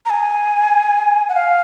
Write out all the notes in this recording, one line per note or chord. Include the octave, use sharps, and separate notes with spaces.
A#5
G#5
F#5
F5